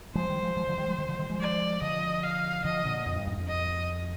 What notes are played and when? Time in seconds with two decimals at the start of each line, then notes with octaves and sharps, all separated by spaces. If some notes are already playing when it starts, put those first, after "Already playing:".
0.15 F3 G#3 C5
0.29 D#3 G3
0.43 F3 G#3
0.57 F3 G#3
0.67 D3 F3
0.78 D#3 G3
0.88 F3 G#3
0.98 D#3 G3
1.08 D3 F3
1.19 D#3 G3
1.29 F3 G#3
1.40 D5
1.82 D3 F3 D#5
2.23 F5
2.65 D3 F3 D#5
2.85 A#2 D3
3.06 F2
3.16 G2
3.27 F2 G#2
3.37 F2
3.48 D#5